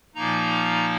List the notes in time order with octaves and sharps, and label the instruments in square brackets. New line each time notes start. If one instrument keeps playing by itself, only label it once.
[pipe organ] A#2 F3 A#3 D#4 A#5